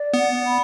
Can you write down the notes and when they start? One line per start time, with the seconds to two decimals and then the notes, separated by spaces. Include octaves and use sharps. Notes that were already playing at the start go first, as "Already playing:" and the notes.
Already playing: D5
0.14 B3 F#5
0.45 B5